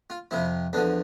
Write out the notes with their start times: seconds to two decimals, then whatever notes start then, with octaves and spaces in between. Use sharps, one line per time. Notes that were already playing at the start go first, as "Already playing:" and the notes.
0.10 F4
0.31 F2 C3 F3 E4
0.73 E2 D3 F3 D4